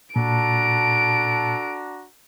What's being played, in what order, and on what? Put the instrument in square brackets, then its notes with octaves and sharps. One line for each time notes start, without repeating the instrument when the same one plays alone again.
[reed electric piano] A#2 [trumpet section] D4 F#4 A#5 [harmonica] A4 [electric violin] D7